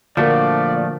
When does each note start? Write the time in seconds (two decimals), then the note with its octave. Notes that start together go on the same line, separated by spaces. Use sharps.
0.17 A#2 D3 F3 A3 F#4 A#4 D5